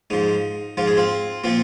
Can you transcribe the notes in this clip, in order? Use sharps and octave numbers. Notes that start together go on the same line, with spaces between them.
G#2 F3 D#4
G#2 F3 F4
G#4
C4 F4
A#2 F3 C4 F4